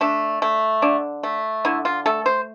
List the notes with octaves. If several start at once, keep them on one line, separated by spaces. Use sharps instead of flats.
A3 D4
A3
D3 D4
A3
D3 E4
F4
A3 A4
C5